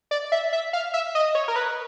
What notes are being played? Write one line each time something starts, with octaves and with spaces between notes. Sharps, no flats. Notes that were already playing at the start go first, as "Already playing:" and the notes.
D5
E5
E5
F5
E5
D#5
C#5
A#4
B4